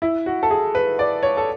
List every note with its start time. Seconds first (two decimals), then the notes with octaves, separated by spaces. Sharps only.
0.02 E4
0.26 F#4
0.43 A4
0.51 G#4
0.75 B4
0.99 D5
1.23 C#5
1.37 A4